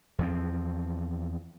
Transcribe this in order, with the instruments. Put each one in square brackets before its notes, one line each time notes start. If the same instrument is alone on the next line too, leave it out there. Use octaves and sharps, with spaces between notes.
[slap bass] E2 F3 C4